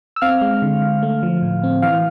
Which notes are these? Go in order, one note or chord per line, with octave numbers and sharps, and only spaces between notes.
E6
C4 F5 F6
G#3
D3
D3
A3
F3
A2
C4
E3 F5 F6